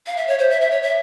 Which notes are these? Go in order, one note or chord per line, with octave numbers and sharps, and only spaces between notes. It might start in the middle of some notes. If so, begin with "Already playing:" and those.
F5
E5
C#5
C5
E5
E5
C#5
E5